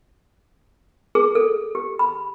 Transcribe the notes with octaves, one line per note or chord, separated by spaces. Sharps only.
G#4
A4
G4
B5